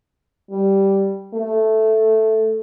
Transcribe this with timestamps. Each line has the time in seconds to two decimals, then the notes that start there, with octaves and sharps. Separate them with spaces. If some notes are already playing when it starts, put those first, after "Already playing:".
0.51 G3
1.34 A3